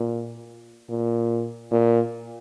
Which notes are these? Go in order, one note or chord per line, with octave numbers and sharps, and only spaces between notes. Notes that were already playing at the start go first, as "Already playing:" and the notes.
Already playing: A#2
A#2
A#2